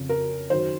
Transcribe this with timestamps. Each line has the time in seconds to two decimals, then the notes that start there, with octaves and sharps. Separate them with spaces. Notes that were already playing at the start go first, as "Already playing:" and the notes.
Already playing: F2 C#3
0.09 A#4
0.50 F#2 D#3 F#3 C5